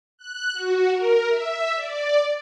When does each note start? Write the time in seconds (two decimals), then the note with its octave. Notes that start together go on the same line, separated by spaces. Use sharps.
0.18 F#6
0.53 F#4
0.92 A#4
1.28 E5
1.75 D5